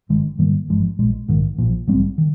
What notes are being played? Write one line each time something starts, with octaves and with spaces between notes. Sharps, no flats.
G1 G2 D#3 G#3
G#2 D#3 G3 A#3
G#1 G2 F3 G#3
A#1 A#2 G#3
A#1 G#2 D#3
A#1 A#2 F3
A#1 G#2 G3 C4
D#3